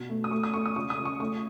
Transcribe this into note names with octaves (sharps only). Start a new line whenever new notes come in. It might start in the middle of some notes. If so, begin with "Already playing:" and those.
Already playing: B2
A3
D#6
A3 C#6
D#6
A3 C#6
D#6
C#2 C#6
D#6
C#2
C#6
A3 C#6